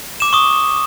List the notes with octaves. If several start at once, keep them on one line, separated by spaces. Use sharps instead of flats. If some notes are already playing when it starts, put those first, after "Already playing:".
D6 E7
C#6 D#6